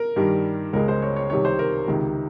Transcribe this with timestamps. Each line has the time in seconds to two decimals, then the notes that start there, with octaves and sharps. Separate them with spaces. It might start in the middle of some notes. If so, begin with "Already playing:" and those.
Already playing: A#4
0.16 G2 D#3 G3
0.73 C#2 C#3 G#3 A#4
0.88 C5
1.02 C#5
1.16 C#5
1.30 C2 C3 D#3 C#5
1.45 C5
1.59 A#4
1.87 C#2 C3 D#3